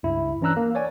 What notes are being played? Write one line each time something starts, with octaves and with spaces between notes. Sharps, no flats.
C#2 G2 E4
E3 C#4 D4 A#5 E6 F#6
A#3
C#5 D5 G#5